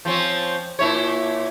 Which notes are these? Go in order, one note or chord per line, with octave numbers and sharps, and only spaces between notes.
F3 C4 C#4
A#2 E4 C#5